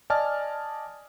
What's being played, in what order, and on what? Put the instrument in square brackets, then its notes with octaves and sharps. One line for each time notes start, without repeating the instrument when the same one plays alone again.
[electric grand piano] D5 D#5 G#5 A5 F6